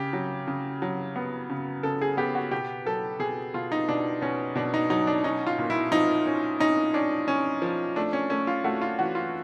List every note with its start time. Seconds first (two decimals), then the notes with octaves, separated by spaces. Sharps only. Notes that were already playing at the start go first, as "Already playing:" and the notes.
Already playing: C#3 G4
0.13 F#3
0.47 C#3
0.82 F#3
1.16 B3
1.49 C#3
1.83 C#3 A4
2.01 G#4
2.17 B3 G4
2.35 F#4
2.52 B2 G4
2.86 F#3 A4
3.19 B2 G#4
3.54 B2 F4
3.72 D#4
3.89 B2 D4
4.22 B2 C#4
4.55 B2 D4
4.74 D#4
4.90 F#3 D#4
5.07 D4
5.24 C#4 D#4
5.47 F4
5.58 A#2
5.70 E4
5.92 F3 D#4
6.27 C#4
6.60 C#4 D#4
6.94 C#4 D4
7.28 C#4
7.62 F3
7.96 A3 D4
8.13 C#4
8.30 A3 C#4
8.47 F4
8.64 A3 F#4
8.82 F4
8.99 E3 F#4
9.15 F4